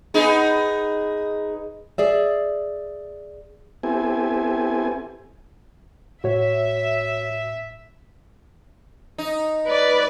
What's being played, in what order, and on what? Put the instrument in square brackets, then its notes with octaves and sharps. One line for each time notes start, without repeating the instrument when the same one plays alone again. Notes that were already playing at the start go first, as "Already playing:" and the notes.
[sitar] B3 D#4 G#4
[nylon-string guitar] G#4 D5 E5
[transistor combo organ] B3 C4 E4 G4 A4 G#5
[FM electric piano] A2 [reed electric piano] F#4 C#5 [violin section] E5
[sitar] D#4
[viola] B4 D5